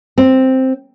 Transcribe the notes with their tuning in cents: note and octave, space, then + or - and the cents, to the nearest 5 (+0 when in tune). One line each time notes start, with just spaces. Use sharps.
C4 +0